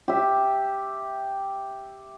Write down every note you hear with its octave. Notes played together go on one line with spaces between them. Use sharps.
G4 E5